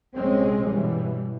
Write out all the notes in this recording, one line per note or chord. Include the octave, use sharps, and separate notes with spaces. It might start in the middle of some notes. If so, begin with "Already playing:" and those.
A#1 C3 G#3 C4 C#4
G2 B2 E3 G3